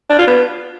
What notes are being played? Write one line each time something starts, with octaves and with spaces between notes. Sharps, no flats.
D4
F4
B3